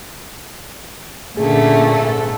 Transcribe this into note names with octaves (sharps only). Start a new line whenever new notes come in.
A#2 D3 A3 C#4 G#4
G#2 A4